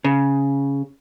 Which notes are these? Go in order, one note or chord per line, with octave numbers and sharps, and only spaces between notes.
C#3